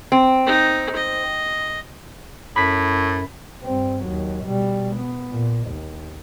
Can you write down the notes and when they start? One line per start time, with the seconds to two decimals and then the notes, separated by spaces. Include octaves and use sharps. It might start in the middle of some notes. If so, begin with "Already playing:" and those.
0.12 C4
0.46 D#4
0.96 D#5
2.56 F#2 A2 B5 B6
3.63 G2 C4
4.04 D#2 F#3
4.44 B2 G3
4.96 B3
5.30 A#2
5.67 D#2